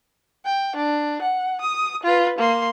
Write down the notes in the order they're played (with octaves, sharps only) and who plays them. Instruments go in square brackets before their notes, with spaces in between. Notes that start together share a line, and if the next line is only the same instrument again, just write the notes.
[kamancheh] G5
D4
F#5
D#6
F4 B4
A#3 C6